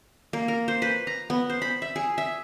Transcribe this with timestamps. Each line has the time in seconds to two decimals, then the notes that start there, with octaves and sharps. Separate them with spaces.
0.33 A#3
0.48 A#4
0.68 C5
0.82 B4
1.07 A#5
1.30 B3
1.50 C5
1.62 B5
1.82 E5
1.96 G#4
2.18 E5